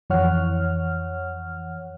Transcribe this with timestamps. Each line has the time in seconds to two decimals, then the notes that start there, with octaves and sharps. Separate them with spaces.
0.10 F2 E3 C#5 F#5 F6